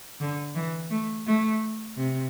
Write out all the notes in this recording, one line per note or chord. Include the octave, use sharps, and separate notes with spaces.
D3
E3
A3
A3
C3